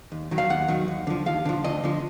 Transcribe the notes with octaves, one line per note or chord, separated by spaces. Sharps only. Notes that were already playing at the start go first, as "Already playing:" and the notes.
D#2
D#3 F#3
F5
D#2 F#5
D#3 F#3
D#2
D3 F3
D#2 F5
D3 F3
D2 D#5
D3 F3